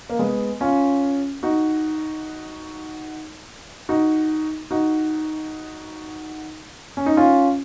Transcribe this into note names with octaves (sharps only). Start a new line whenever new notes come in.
A#3
G#3 B3
C#4 F4
D#4 F#4
D#4 F#4
D#4 F#4
C#4
D#4
C#4 F4